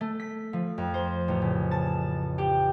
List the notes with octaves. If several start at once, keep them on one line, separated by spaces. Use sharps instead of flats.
A3
B6
F3
F2
C5
A1
C#3
A5
G4